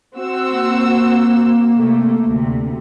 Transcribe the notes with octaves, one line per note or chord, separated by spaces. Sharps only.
C4 F#4 E6
A#3
C3 A3
D2 C3